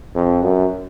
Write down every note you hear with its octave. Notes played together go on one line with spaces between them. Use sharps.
F2
F#2